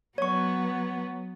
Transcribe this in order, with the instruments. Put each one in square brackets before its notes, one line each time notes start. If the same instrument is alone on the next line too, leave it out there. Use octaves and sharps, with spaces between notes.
[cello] F#3 B3 [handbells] C#5 C#6